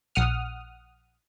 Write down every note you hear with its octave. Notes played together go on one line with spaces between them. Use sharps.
A#1 F#5 D#6 F6